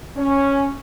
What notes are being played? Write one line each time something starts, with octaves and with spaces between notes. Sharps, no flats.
C#4